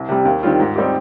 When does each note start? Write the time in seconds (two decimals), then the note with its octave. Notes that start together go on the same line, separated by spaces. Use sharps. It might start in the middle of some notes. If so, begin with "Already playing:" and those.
Already playing: C2
0.09 C3 G3
0.25 D#2
0.43 D#3 G3 C4 F4
0.60 G#2
0.76 G3 C4 D#4 G4